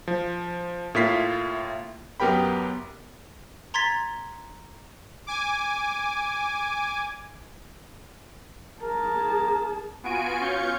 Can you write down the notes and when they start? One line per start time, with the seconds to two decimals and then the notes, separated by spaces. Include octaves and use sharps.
0.08 F3
0.95 A2 A#3 E4 F4 B6 C7
2.20 F#2 B3 G4 A#4 G5 B5
3.74 A#5 C6 G#6 A6 B6
5.27 G#5 D6
8.82 G#4 A#4 A5
10.03 B3 F4 F#4 G#5 D7
10.40 C#4 F4 F5 C#6 G6 C#7